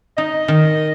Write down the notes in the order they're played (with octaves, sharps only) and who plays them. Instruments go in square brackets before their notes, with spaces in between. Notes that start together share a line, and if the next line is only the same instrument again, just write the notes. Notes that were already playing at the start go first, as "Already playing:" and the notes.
[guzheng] D#4 [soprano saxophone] D#5
[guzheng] D#3